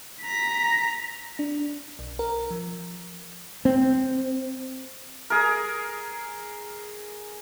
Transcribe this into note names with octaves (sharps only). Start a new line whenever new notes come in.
A#5 B6
D4
B1
A#4
F3
C4
G#4 A#4